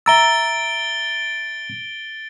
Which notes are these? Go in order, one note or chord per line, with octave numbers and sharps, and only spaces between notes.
E5 A#5 E6 A6 D7 G7